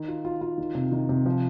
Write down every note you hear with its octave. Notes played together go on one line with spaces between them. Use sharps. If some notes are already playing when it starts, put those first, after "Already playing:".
Already playing: D#3
F4
F4
F4
D#3
C3
D#3
C3
F3